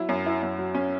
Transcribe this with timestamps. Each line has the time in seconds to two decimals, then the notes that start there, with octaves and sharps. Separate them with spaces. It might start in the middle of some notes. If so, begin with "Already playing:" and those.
Already playing: F#3 E4
0.09 F#2
0.26 E4
0.42 F#2
0.59 F#3
0.75 C#4